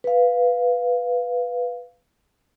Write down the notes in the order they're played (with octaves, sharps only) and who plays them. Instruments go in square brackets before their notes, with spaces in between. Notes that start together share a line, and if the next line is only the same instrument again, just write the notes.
[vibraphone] B4 F5